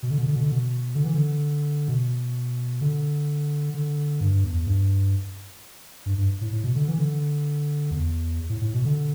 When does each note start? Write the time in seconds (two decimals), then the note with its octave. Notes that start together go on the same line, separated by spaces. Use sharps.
0.03 B2
0.11 D3
0.18 B2
0.27 D3
0.36 B2
0.43 D3
0.52 B2
0.95 D3
1.04 E3
1.14 D3
1.88 B2
2.81 D3
3.74 D3
4.20 G2
4.44 E2
4.67 G2
6.06 G2
6.18 G2
6.41 A2
6.52 A2
6.64 B2
6.75 D3
6.88 E3
6.99 D3
7.91 E2
8.49 A2
8.62 A2
8.73 B2
8.85 D3